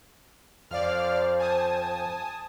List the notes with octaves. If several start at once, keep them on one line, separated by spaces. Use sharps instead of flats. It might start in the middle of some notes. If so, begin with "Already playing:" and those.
F2 C5 D5 F5 F6
G#5 A5 D#6